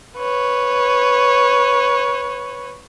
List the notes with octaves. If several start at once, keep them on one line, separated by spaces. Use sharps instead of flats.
B4 C#5